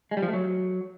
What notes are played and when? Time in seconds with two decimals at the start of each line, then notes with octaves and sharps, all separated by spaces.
0.11 G#3
0.17 G3
0.22 F3
0.28 A3
0.34 F#3